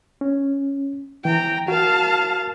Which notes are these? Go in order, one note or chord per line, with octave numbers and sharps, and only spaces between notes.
C#4
E3 G5 A#5
F#4 A#4 F5 A5